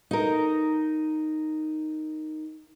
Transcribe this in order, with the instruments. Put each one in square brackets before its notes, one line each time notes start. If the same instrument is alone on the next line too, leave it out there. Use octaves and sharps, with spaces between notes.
[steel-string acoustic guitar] D#4 A#4